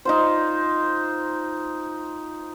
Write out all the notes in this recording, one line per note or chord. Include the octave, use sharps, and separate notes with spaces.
D#4 F4 C5